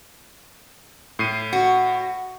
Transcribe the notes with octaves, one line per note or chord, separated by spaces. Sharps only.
A2 C7 D#7
F#4